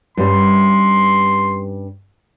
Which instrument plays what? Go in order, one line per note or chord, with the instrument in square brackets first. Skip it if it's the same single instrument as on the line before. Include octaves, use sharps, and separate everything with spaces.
[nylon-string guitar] G2 G3 C#4 [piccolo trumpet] C6